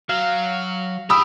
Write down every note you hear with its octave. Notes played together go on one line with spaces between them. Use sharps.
F#3 F5
G4 G#4 B5 D#6 E6